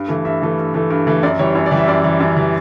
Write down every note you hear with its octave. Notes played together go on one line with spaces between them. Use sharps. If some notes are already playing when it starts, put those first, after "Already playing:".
Already playing: G2
E3 A3
G2 E5
E3 A3
G2
E3 A3
G2
E3 A3
F#2 D5
E3 G3 C#5
F#2 C#5
D5
E3 G3
E5
F#2 D5
E3 G3
F#2
E3 G3